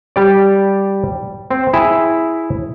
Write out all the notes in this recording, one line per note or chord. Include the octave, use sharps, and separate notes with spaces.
G3 G4 D5
C4
E4 G#4 E5